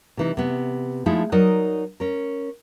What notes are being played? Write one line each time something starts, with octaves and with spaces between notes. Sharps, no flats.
C3 E3 D#4
C3 B3
F3 G#3 A3 D#4 E4
F#3 D#4 A#4 D5 D#5
C#4 A#4